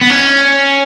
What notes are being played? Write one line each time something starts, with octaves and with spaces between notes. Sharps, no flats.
B3
C#4